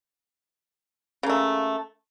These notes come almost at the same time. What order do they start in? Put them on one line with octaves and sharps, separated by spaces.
C#3 A#3 A3